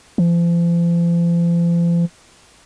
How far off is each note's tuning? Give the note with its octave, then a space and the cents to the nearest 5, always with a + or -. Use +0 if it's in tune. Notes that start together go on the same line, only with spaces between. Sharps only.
F3 -40